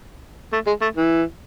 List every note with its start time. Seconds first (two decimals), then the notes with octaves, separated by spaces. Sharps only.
0.53 A3
0.67 G#3
0.82 A3
0.97 E3